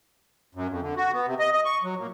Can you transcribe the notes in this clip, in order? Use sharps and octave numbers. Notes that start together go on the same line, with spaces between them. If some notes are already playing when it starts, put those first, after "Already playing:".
F#2
F2
D3
F#4
B3
C3
D#5
D#5
C#6
F#3
A#2